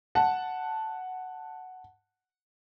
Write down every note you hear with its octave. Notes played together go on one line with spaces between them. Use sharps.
F#5 A5